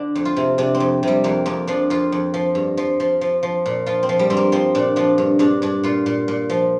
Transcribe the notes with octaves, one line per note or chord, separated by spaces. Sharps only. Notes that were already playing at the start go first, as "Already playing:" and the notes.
Already playing: D3 D4
F2
F4
C3
C3 D4
C4
F2
C3 G3
F2 A#3
F2 A#3
F3 D4
F2 F4
F2
F3
G2
F3
F3
F3
F3
A#2
F3 F4
C4
F3
G3
G2 C4
A#3
F3 C4
A#2 D4
F3 D4
G2
G2 D4
G2 D4
A#2 F4
A#2
A#2
F3